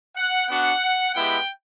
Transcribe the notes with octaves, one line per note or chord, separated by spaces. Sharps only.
F#5
B3 D4 F#4 F#5
G#3 B3 E4 G4 G5